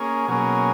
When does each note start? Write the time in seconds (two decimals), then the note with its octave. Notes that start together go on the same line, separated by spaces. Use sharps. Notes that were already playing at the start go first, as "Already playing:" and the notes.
Already playing: A#3 C#4 G#4
0.28 B2 F#3 A#3 C#4 G#4